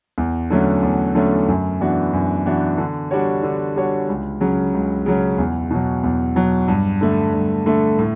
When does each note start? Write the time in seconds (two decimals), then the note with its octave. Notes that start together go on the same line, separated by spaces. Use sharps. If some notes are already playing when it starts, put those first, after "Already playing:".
0.18 E2
0.50 D3 F#3 A3 C#4
0.83 E2
1.15 D3 F#3 A3 C#4
1.48 F#2
1.81 E3 B3 D4 F#4
2.13 F#2
2.46 E3 B3 D4 F#4
2.78 D3
3.11 G3 D4 F#4 C#5
3.43 D3
3.76 G3 D4 F#4 C#5
4.08 C#2
4.40 C#3 F#3 C#4
4.73 C#2
5.06 C#3 F#3 C#4
5.38 E2
5.71 B2 F#3
6.04 E2
6.36 B2 F#3
6.68 G2
7.01 D3 A3
7.34 G2
7.66 D3 A3
7.99 A2